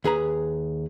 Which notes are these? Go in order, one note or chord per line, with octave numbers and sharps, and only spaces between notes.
D#2 G#4 B4 A#5